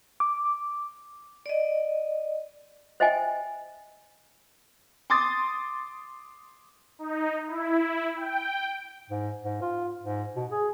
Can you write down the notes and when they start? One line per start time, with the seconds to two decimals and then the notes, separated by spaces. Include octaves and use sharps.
0.20 D6
1.46 D5 D#5
3.00 C5 D#5 E5 G5 G#5
5.10 C6 D6 D#6 A6
6.99 D#4
7.47 E4
8.17 G5
9.10 G#2
9.43 G#2
9.62 F4
10.03 G#2
10.36 B2
10.51 G#4